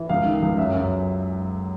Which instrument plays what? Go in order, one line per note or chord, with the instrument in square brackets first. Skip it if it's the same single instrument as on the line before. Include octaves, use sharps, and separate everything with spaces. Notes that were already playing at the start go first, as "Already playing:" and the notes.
Already playing: [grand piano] E3
C#2 F5
D#3
C#2
F#2 E5
F#2